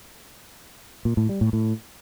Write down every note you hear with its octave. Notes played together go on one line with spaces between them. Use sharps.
A#2
A2
G3
A2
A2